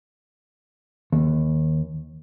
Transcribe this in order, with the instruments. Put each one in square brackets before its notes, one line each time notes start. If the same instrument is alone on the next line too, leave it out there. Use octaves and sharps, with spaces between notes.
[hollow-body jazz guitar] D#2